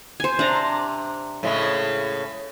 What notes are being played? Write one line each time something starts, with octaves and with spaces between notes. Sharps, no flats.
C5 G#5
C3 D4 A#5
A2 C#3 G#3